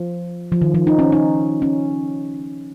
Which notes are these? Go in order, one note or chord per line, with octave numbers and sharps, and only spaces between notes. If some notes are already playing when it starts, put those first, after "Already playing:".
Already playing: F3
F3
D#3
F3
D#4
C#4
D#4
C#4